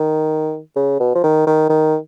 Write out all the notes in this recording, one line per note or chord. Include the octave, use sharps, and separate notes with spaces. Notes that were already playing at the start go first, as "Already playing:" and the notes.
Already playing: D#3
C#3
B2
F3
D#3
D#3
D#3